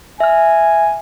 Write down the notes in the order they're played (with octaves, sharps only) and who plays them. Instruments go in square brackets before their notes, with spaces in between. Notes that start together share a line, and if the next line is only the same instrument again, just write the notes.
[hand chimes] E5 F6 [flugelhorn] G#5